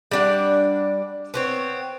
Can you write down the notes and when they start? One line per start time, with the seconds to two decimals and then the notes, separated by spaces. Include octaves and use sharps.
0.11 G3 D4 F#5
1.34 B3 C4 C#5